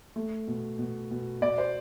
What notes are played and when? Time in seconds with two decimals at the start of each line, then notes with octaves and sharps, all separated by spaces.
0.16 A3
0.48 B2
0.79 B2
1.11 B2
1.42 B2 D5
1.58 C5